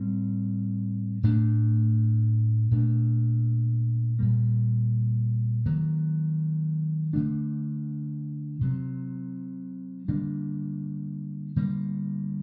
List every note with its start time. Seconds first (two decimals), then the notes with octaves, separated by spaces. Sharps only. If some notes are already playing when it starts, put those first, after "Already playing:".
Already playing: A2 G3 C4
1.23 A2 A3 D4
2.71 A#2 A3 D4
4.19 A#2 G3 A#3
5.66 D#3 F#3 A#3
7.13 D3 A3 D4
8.61 C3 F#3 C4
10.08 D3 G3 A#3 D4
11.56 D3 G3 A#3